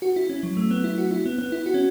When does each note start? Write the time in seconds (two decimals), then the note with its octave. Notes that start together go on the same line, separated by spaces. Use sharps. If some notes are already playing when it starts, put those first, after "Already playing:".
0.02 F#4
0.16 E4
0.30 C#4
0.43 F#3
0.57 A3
0.71 B3
0.84 E4
0.98 F#4
1.11 E4
1.26 B3
1.38 B3
1.52 E4
1.66 F#4
1.74 C#4